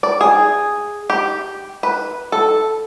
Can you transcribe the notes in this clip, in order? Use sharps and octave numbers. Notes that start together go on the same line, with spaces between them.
D5
G#4
G4
B4
A4